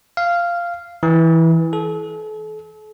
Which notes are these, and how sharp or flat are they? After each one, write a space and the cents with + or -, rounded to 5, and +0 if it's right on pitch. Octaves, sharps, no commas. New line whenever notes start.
F5 -10
E3 -10
A4 -40